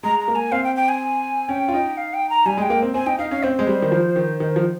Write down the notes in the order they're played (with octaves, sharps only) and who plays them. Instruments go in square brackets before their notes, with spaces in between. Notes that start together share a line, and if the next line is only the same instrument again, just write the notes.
[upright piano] G#3 [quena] A#5
[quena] A#5
[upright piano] A#3
[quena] G#5
[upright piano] C4 [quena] F5
[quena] G5
G5
G#5
[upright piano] C#4 [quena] G5
[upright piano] F4
D#4
[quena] F5
G5
A#5
[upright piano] G3 [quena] G#5
[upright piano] G#3 [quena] G5
[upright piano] A#3
C4
[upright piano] C4 [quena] G#5
[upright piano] D#4 [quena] G5
[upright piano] D#4 [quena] F5
[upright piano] C#4 [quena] F5
[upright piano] C4 [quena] C5
[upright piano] G#3
G3
D#3
F3
D#3
D#3
F3